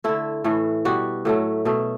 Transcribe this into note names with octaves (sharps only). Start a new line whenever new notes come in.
D3 A3 E4
A2 E3 A3
B2 G3 F#4
A2 F#3 A3
B2 A3